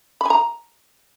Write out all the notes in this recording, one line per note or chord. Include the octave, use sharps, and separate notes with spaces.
G#5 A#5 B5